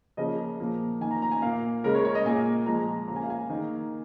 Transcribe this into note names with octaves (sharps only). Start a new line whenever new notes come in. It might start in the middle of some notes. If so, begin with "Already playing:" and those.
C#3 F3 A#3 D#5
A#2 F3 A#3
D#3 A#3 G#5
A#5
A#5
G#5
A#2 A#3 F5
C#3 G#3 A#4
C#5
C#5
D#5
A#2 A#3 G#5
A#2 F3 G#3 A#5
C#3 A#3 A#5
G#5
F5
G#5
D#3 A#3